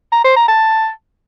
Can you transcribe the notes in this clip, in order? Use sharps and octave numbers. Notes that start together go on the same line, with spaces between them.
A#5
C5
A#5
A5